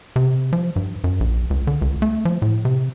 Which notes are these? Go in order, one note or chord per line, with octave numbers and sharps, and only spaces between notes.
C3
F3
G2
F#2
A#1
C#2
D3
C#2
A3
F3
A2
C3